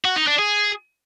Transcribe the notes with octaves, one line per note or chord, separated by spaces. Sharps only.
F#4
D#4
D4
G#4